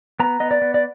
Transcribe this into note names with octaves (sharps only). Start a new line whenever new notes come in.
B3 A#5
B3 D#5
D5
B3
D5